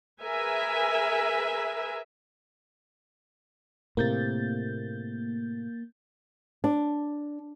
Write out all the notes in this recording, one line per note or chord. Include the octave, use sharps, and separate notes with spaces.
G#4 A#4 B4 E5 G#5
A2 C3 A#3 G6 A6
D4